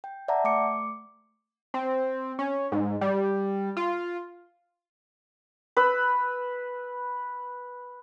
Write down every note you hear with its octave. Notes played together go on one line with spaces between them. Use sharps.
G5
D5 E5 F#5 A5 A#5
A3 D6 C#7
C4
C#4
G#2
G3
F4
B4 E6